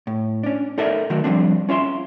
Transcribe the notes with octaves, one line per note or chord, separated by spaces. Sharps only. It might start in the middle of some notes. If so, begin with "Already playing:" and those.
A2
C#4 D4
D#4 A4 A#4 D5 E5
D#3 F#3 A3 F#4 A#4
F3 G3 C4 D4
C#4 F4 E5 C6